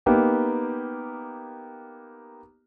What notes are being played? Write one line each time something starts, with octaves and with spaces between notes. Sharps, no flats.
A#3 B3 D#4 G4